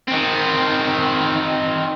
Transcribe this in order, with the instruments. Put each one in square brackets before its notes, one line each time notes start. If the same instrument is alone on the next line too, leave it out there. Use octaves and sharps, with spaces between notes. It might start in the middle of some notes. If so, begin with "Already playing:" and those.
[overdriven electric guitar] D#3 C4